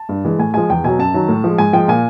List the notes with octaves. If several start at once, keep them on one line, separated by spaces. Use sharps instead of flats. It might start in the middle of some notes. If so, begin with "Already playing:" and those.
Already playing: A5
G2
E3 G#3
A2 G#5
F3 G#3 G#5
E2 G5
B2 F#3 G#5
F#2 A5
D#3 F#3
A2
F3 G#3
G#2 G#5
F3 G#3 G5
A#2 G#5